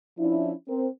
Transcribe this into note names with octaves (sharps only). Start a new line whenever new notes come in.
F3 C#4 D4 E4
C4 A#4